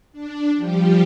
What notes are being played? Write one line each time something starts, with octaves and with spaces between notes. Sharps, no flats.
D4
F3 G3 G4